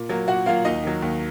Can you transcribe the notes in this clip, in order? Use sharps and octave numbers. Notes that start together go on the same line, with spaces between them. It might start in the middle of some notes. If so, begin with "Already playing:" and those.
Already playing: A#2
F#3 A#3
A#2 F#4 F#5
F#3 A#3 F4 F5
D#2 D#4 D#5
D#3 F#3
D#2